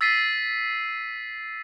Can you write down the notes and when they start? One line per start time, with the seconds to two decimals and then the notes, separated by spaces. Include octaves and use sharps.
0.01 E6 A6 B6 C7 D#7